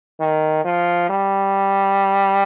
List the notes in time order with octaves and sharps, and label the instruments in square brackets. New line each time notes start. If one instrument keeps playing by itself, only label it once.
[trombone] D#3
F3
G3